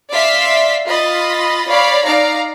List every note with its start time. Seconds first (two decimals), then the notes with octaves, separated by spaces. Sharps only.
0.11 D5 E5 F5 C6 B6
0.87 F4 D#5 B5 A6
1.68 C#5 D5 F5 B5
2.06 D#4 D5 F5 A#5